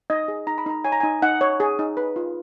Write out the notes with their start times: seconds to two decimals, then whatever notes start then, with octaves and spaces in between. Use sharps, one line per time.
0.10 D#4 D#5
0.28 G#4
0.47 D#4 A#5
0.58 B5
0.66 D#4 A#5
0.84 C#5 G#5
0.92 A#5
1.00 D#4 G#5
1.22 D#4 F#5
1.41 C#5
1.60 G#4
1.79 D#4
1.97 B4
2.16 F4